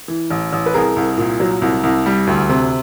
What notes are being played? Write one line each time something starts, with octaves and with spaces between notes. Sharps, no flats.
E3
A1
A1
B4
C2 G#4 A#4
C2
A#2
F#3
C2
C2
G3
D2
C3